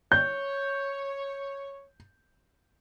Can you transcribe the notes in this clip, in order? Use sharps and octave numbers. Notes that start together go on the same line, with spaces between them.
C#5 G6